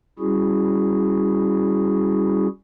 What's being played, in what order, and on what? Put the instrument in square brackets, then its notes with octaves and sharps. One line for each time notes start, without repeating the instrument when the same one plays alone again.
[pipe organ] G3 C#4 E4 F#4 G#4